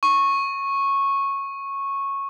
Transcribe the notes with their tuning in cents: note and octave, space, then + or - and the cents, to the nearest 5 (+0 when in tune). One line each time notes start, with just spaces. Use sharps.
C#6 -10